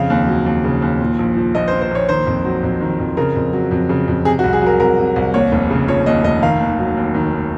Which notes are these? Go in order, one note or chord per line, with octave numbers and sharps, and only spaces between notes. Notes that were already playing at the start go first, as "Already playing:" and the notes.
Already playing: F2 C#3 F5
D#2
F#3
D#2
C#3
D#2
A#2
A#1
F3
A#1 D#5
C5
A#2
C5
A#1 C#5
D#3 C5
F2
F#3
F2
D#3
F2
C#3 A#4
F2
F#3
F2
C#3
F2
C3 G#4
F#4
C2
G#4
F#3 A#4
C2 A#4
C3
C2
D#2 C#5
F1
C#3
F3 C#5
D#2 D#5
F1 D#5
D#3 F5
D#2
F#3
D#2
D#3
D#2